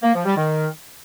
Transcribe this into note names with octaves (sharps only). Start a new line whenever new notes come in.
A#3
F3
G3
D#3